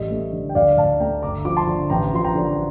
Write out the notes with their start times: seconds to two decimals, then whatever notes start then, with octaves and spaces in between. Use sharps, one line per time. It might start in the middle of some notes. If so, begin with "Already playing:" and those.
Already playing: A1 G3 D#5
0.11 A3
0.33 D3
0.49 G5
0.55 D2 D5 F5
0.77 D2 F5 A5
1.00 A3 G5 A#5
1.22 G1 A#5 D6
1.45 F3 D6
1.57 A5 C6
1.67 D3
1.90 A1 G5 A#5
2.13 F3 C6
2.24 G5 A#5
2.35 D3